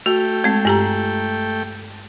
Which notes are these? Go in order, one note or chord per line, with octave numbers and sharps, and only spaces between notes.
A3 F#4 G5
G#3 C4
G2 G4 A#5